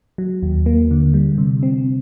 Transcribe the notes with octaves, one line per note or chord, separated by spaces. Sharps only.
F#3
D#2
A#3
D3
G3
C3
C4